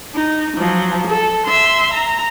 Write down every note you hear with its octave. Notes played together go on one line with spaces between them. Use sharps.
D#4
F3 F#3
A4
E5 C6
A#5